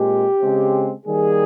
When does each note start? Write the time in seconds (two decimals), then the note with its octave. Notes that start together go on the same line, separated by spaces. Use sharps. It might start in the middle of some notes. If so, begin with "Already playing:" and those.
Already playing: A#2 G#3 C4 G4
0.40 C#3 G#3 C4
1.06 D#3 G3 A#3 G#4